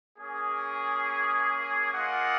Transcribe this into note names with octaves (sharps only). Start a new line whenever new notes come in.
A#3 C#4 G#4
A#3 F4 G#4 D#5 F#5